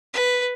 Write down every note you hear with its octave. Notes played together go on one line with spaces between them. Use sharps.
B4